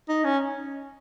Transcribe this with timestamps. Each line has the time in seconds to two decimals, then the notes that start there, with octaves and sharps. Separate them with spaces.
0.09 D#4
0.24 C#4